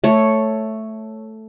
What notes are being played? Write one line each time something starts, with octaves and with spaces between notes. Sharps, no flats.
A3 C#5